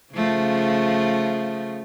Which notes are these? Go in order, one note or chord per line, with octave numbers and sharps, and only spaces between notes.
C#3 F3 A3